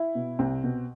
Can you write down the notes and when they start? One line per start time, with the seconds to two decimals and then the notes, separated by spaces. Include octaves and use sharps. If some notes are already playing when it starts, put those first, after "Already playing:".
Already playing: E4
0.15 B2
0.39 C2 C4
0.64 B2